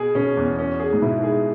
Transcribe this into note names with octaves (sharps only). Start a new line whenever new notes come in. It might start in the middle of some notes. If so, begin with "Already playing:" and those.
Already playing: B2 G#4
B2 C#4
E2
C#4
G#4
G#2
B2 E4
G#4